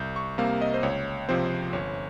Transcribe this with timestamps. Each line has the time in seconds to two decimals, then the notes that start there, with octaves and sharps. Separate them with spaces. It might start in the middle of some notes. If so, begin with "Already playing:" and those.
Already playing: C2 G6
0.16 C#6
0.38 C3 G3 A#3 F5
0.61 D#5
0.74 C5
0.83 C#2 C#5
1.29 C3 F3 C4 C5
1.73 G1 C#5